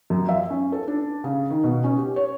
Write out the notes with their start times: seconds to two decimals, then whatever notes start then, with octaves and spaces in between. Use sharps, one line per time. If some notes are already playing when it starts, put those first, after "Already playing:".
0.10 F#2
0.29 E5
0.50 C#4
0.72 A4
0.88 D4
1.24 C#3
1.50 D#3
1.64 B2
1.84 C#4
1.97 G4
2.16 C#5